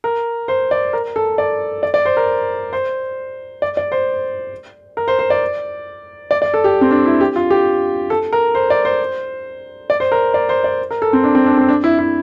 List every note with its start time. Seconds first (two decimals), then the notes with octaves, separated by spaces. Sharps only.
0.04 A#4
0.48 C5
0.71 D5
0.93 A#4
1.16 A4
1.38 D5
1.83 D5
1.94 D5
2.05 C5
2.17 A#4
2.73 C5
3.62 D5
3.77 D5
3.92 C5
4.97 A#4
5.08 C5
5.19 C5
5.30 D5
6.31 D5
6.42 D5
6.54 A4
6.64 G4
6.81 C4
6.91 D4
7.06 E4
7.21 G4
7.36 F4
7.50 G4
8.10 A4
8.33 A#4
8.55 C5
8.70 D5
8.85 C5
9.90 D5
10.00 C5
10.12 A#4
10.34 D5
10.49 C5
10.64 D5
10.91 A#4
11.02 A4
11.13 C4
11.24 D4
11.35 C4
11.46 D4
11.57 C4
11.69 D4
11.84 E4
11.99 E4